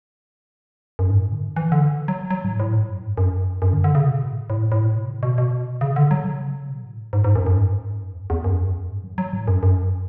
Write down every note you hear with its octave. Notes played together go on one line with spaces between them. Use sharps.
F#2
G#2
A2
D3
E3
D3
F#3
F#3
A2
A2
G#2
F#2
G#2
F#2
F#2
D3
D3
C#3
B2
A2
A2
A2
B2
C#3
B2
B2
C#3
D3
F#3
C#3
B2
A2
G#2
G#2
F#2
F#2
G#2
F#2
E2
E2
F#2
E2
F#2
G#2
F#3
F#3
A2
F#2
F#2